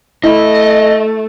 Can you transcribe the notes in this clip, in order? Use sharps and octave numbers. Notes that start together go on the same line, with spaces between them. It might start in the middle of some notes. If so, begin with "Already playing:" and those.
A3 E4 D#5